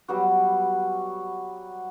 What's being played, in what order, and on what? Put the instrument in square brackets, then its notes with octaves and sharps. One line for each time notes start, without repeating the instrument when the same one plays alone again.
[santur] F#3 G3 B3 F#4